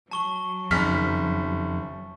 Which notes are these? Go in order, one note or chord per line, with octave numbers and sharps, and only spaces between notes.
F#3 A5 C#6 G7
F#1 F2 D#3 F6 B6